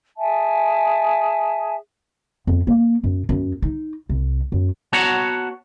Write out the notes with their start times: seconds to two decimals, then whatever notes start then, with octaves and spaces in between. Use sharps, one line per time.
0.17 G#4 E5 G#5 A5
2.47 F2
2.67 A#3
3.04 F#2
3.29 F#2
3.62 D#4
4.09 C2
4.52 F#2
4.93 B3 F#4 C#5 F#5 A5 A#5